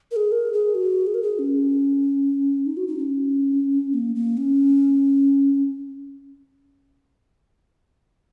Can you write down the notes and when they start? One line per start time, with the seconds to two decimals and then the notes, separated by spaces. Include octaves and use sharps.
0.11 A#4
0.16 G#4
0.32 A#4
0.53 G#4
0.75 F#4
1.07 G#4
1.14 A#4
1.23 G#4
1.39 C#4
2.66 D#4
2.77 F#4
2.88 D#4
2.99 C#4
3.94 A#3
4.15 A#3
4.37 C#4